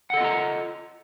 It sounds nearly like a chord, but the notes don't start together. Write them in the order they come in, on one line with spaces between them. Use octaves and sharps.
F#5 A4 D#5 F4 A#5